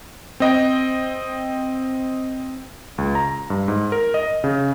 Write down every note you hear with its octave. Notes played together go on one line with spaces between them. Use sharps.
C4 D#5 G5
C#2
A#5
G2
G#2
A#4
D#5
C#3